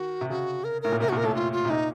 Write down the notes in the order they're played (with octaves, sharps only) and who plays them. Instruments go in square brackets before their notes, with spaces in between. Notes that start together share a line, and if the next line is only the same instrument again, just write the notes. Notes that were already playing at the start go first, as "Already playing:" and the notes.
Already playing: [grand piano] D#3 [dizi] F#4
[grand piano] C3
[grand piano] C#3 [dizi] F#4
[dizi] A#4
[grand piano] A2 [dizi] A#4
[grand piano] A#2
[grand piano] C3 [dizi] A#4
[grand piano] A#2 [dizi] F#4
[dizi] A#4
[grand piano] A2 [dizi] A4
[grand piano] A2 [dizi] F4
[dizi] F4
[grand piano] C3
[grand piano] A#2 [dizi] D#4